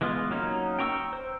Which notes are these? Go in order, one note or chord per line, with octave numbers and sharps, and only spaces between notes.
E3 G#3 B3 F4
F#3 A#3 C#4 D#4
G5 A#5 C#6 D#6 E6
C5